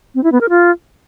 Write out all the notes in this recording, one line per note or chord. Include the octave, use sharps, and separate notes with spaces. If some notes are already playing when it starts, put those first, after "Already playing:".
C4
E4
B3
A#4
F4